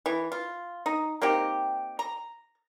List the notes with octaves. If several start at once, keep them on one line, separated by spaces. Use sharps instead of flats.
E3
F4
D#4
A#3 C4 D#4 G4
A#5